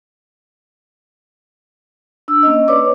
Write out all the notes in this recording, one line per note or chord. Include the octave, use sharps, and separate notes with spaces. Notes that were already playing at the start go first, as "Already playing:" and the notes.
D4 E6
A#3 C#4 D#5
B4 C#5 D5 D6